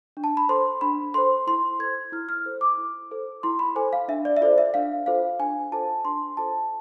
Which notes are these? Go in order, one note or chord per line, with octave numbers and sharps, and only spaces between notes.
D4
A5
B5
A4 C5 C6
D4 B5
A4 C5 C6
E4 C6
A4 C5 G#6
E4 F6
F6
A4 C5
D6
E4
A4 C5
E4 C6
B5
A4 C5 G#5
F5
D4 E5
D5
E5
F4 A4 C5 D5
E5
D4 F5
F4 A4 C5 F5
D4 G#5
F4 A4 C5 A5
D4 C6
F4 A4 C5 A5